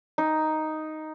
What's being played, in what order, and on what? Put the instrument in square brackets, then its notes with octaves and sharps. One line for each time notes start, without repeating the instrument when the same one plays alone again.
[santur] D#4